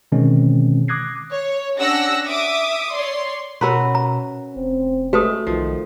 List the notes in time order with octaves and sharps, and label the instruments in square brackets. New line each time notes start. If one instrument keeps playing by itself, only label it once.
[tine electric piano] B2 D3 D#3 G#3 C4 C#4
D6 D#6 F#6 G#6 A#6 C7
[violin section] C#5
C#4 D4 G4 F#5 E6 A#6
E5 D6 D#6
C#5 D5 C6
[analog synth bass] B2 [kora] C#4 F#4 B4 [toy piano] A#4 A#5 C6
[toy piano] A#5
[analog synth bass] F1 [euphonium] C4
[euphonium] G#3 [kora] A3 [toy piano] F#4 B4 D#6
[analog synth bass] B1 [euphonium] D#3 [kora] F3